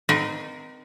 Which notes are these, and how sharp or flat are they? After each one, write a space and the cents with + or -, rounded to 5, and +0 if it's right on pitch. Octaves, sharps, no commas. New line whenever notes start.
C4 -35 D#4 -20 A#4 +45